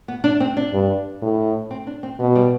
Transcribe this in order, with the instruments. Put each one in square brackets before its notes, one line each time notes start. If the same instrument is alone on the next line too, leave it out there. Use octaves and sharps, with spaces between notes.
[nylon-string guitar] B3
D4
C4
D4
[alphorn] G2
A2
[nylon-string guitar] C4
D4
C4
[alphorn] B2 [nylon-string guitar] B3
[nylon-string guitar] G3